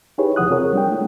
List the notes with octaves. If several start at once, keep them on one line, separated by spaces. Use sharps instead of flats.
D#4 E4 G4 G#4 B4 C#5
D#2 C3 F3 F#5 D#6 F#6
C4 F4 G#4 A#4 C#5
G3 D4 G5
A3 E4